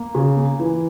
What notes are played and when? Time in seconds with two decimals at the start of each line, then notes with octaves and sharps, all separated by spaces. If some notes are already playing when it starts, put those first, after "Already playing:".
Already playing: A#3
0.15 C#3
0.36 A#3
0.60 E3